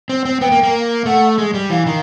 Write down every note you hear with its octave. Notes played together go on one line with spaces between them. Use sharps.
C4
C4
B3 G5
A#3
A#3
A3 F#5
G#3
G3
E3 F5
D#3